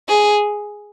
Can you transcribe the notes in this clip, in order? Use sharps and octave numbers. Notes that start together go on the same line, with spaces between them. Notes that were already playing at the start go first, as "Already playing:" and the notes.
G#4